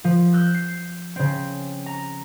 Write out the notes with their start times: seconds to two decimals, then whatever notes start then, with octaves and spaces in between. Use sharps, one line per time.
0.04 F3
0.33 E6 F#6 G6
0.55 C7
1.16 C#3 C4
1.86 A#5